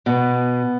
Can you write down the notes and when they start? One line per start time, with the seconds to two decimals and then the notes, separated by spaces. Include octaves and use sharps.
0.06 B2 B3